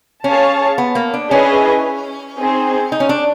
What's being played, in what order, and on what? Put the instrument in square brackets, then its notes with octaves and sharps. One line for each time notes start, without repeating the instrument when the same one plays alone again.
[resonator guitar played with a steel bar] C#4 [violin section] G#4 C#5 F5 A5
[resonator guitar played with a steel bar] B3
A#3
D4
[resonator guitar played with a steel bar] C#4 [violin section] E4 G#4 B4 D#5 G#5
[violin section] C4 D#4 G#4
[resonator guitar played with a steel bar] D#4
C#4
D4